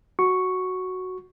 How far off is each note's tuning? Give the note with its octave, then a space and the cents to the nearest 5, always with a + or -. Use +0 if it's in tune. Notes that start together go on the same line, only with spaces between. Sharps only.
F#4 +0 C#6 +0